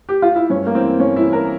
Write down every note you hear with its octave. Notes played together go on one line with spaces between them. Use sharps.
G4
F4
E4
G2 C#4
A#3
E3 C4
G2 C#4
E4
E3
A#4